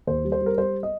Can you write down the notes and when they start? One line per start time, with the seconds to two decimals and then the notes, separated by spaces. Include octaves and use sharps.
0.07 D#2 C5
0.24 G3
0.32 C5
0.41 G3
0.46 A#4
0.58 G3 C5
0.83 D#5